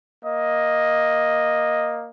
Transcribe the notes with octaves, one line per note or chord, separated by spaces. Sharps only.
A#3 D#5